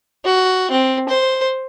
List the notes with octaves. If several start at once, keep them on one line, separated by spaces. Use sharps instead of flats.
F#4
C4
C5